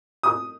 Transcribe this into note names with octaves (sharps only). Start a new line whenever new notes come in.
D#6